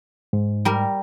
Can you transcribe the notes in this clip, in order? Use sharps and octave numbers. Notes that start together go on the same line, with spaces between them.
G#2
G3 A#4